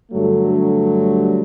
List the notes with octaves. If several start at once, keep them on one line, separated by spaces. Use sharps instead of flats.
G2 D3 F#3 A3